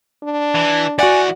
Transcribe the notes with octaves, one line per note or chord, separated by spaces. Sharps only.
D4
E3
E3 F#4 D5 F#5 G#5